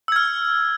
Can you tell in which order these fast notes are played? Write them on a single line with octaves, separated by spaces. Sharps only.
E6 G#6 F6